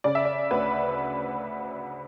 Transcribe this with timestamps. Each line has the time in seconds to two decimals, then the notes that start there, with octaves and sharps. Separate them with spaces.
0.04 C#3 D5
0.15 E5
0.25 D5
0.51 D2 B4